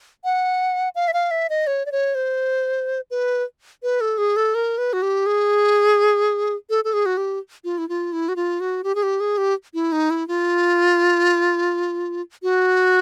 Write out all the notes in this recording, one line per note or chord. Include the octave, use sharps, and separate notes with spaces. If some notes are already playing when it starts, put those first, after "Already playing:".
F#5
F5
E5
F5
E5
D#5
C#5
D5
C#5
C5
B4
B4
A4
G#4
A4
A#4
B4
F#4
G4
G#4
A4
A4
G#4
F#4
G4
F4
E4
F4
E4
F#4
F4
F#4
G4
G#4
G4
G#4
G4
E4
D#4
E4
F4
F#4